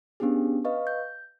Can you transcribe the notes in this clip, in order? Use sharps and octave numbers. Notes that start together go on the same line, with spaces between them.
B3 C#4 D4 G4 G#4
B4 D#5 F5 C#6
G6